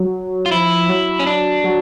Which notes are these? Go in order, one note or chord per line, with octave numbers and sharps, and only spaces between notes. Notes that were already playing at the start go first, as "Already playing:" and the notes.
Already playing: F#3
F4
F3 E4
F#3
C#4
D4
F#3